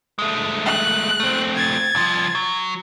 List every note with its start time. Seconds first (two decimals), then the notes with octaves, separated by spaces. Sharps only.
0.19 G#3 A3
0.66 F#6
1.20 A3 C4
1.56 G#6 A6
1.95 C2 F3
2.35 F#3